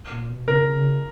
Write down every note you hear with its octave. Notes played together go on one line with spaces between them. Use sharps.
A#2
B2
C#3 A#4
C#3